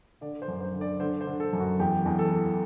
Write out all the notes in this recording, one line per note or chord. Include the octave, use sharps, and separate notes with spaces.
D3 D5
C5
F#2
C5
D3
D5
D3 C5
C5
D3
A4
F#2
F#4
E2 G4
E2
A4
E3